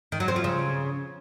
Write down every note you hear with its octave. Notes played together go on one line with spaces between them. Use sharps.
D#3
F#3
C4
F3
C#3